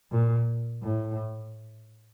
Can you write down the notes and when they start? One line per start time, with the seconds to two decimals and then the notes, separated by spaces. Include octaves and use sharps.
0.12 A#2
0.83 A2